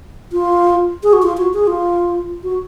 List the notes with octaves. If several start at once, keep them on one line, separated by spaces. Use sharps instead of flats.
F4
G#4
F#4
F4
F#4
G#4
F4
F#4